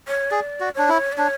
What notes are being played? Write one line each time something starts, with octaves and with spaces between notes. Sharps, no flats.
C#5
G#4 D5
F#4
D4 C#5
E4
D5
D4 C#5